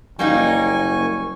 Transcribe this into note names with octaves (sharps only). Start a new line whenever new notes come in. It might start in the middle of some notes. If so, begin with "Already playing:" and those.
F#1 G3 A#3 D#4 G#5 C#6